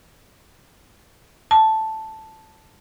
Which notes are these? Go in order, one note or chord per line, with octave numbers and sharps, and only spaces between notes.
A5